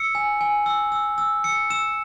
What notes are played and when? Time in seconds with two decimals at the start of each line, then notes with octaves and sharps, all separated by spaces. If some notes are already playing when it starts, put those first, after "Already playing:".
Already playing: E6 C#7
0.15 G#5
0.41 G#5
0.66 E6
0.92 E6
1.18 E6
1.44 E6 C#7
1.70 E6 E7